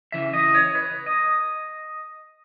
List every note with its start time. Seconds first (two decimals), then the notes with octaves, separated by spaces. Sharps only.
0.12 C#3 E3 E5
0.33 D#5
0.55 C#5
0.75 B4
1.06 D#5